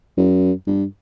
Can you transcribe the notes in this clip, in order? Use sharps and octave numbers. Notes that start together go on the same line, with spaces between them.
F#2
G2